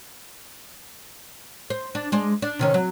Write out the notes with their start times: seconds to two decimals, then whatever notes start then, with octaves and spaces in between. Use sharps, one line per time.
1.70 C5
1.95 D4
2.12 G#3 C5 D5
2.42 D4
2.59 C3 D#3 C#4
2.74 F#3